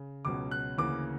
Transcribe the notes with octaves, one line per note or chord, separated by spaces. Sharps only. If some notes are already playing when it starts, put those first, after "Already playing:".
Already playing: C#3
C#2 B2 F#3 C#4 D6
F#6
D2 C#3 E3 A#3 D6